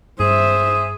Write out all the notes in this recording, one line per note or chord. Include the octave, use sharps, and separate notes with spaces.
G2 G#4 C5 E5